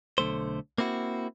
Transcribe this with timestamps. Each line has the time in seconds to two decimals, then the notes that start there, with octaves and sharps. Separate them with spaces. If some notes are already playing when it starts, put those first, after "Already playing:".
0.18 B1 D3 A3 C5
0.78 A#3 C4 E4 F#4